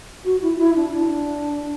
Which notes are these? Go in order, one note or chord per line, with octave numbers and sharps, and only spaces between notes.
F#4
E4
E4
D4
D4